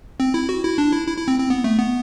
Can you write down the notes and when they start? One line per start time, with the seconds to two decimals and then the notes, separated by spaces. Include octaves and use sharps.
0.20 C4
0.34 E4
0.49 F#4
0.64 E4
0.78 D4
0.92 E4
1.07 E4
1.17 E4
1.28 C4
1.39 C4
1.50 B3
1.64 A3
1.79 B3